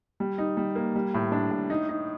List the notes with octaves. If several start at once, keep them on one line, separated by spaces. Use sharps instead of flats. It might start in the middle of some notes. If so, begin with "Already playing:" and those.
G3
D#4
G3
A#3
G3
A2
D4
A2
D#4
D#4